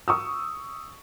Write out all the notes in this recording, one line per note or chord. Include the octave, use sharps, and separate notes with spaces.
C#6 D#6 E6